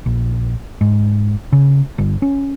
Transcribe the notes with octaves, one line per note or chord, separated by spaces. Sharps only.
A#1
G#2
C#3
G1
C#4